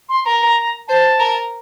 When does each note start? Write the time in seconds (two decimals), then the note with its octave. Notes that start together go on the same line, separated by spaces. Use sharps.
0.09 C6
0.25 A#4 A#5
0.88 C5 A5
1.20 A#4